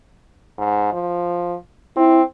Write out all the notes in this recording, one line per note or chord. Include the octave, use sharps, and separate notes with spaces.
G#2
F3
C4 E4